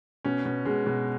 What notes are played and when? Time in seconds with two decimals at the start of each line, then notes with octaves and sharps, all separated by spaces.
0.25 B2 C#4
0.45 B2
0.65 B2 G#3
0.86 B2